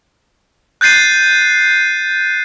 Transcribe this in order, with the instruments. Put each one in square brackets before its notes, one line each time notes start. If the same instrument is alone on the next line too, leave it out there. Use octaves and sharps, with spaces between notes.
[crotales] F#6 G6 A6 C7 D#7